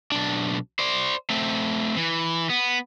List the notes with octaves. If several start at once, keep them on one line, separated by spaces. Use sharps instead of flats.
B1 D4
C5 D5
A3 C4
E3
B3